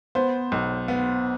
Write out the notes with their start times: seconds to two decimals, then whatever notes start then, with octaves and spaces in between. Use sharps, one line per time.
0.15 B3 C5
0.52 B1
0.88 B3